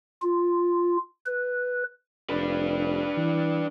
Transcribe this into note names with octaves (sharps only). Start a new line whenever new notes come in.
F4
B4
F1 D4 B4
E3